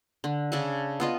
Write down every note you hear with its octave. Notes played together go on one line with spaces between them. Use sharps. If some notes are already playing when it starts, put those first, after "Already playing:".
D3
C#3 D4 A4
B3 F4 D#5